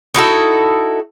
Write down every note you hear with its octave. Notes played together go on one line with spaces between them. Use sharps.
D#4 E4 F#4 A4